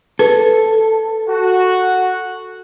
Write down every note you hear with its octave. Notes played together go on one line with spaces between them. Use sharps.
A4 B4
F#4